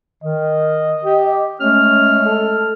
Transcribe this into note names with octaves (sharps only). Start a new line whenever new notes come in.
D#3 D#5
G4
G#3 A3 C#4 F6
A4